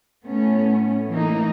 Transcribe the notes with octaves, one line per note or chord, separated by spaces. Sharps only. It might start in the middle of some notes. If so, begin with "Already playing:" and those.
A2 A3 B3 C#4
E3 A3 A#3 D#4